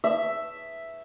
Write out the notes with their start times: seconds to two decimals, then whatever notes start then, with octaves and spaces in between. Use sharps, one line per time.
0.04 E5